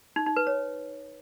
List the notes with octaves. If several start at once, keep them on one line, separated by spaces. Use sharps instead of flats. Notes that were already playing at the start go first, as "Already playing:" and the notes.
D#4
D#4
B4
C#5